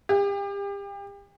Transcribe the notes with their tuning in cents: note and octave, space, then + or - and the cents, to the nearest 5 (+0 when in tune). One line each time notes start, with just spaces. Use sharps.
G4 +35